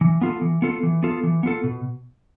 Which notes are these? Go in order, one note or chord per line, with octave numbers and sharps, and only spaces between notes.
E3
B3 F4 A4
E3
B3 F4 A4
E3
B3 F4 A4
E3
B3 F4 A4
B2